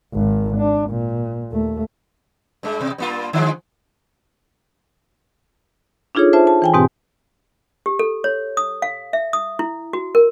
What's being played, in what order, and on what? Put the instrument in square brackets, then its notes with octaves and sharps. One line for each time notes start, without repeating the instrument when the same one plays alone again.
[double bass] G#1 D#3
D4
A#2
D#2 A3
[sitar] G2 G#3
B2
G2 A#3 F4
D3 F3 G#3
[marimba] D4 D#4 F4 G#4 A4 C#5
F4 C5 E5 A5
A5
E3 G5 G#5
G#2 B2 C4 G4 G#5
[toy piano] G4
A4
C#5
D#6
F5
E5
D#6
E4
F#4
A#4